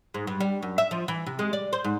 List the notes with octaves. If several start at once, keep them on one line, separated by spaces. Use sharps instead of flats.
G#2
G2
G3
F#2
E5
F3
E3
C3
G#3
D5
C5
G#2